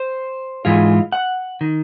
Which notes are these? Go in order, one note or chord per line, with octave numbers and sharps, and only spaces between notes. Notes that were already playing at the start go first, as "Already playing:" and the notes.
Already playing: C5
G#2 E3 G#3 F4
F#5
D#3